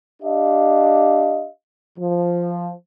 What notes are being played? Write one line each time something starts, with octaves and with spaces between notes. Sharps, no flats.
D4 G4 D#5 F5
F3